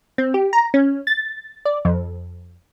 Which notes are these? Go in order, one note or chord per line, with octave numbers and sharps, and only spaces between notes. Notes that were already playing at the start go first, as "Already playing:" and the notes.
C4
G4
A#5
C#4
A6
D5
F2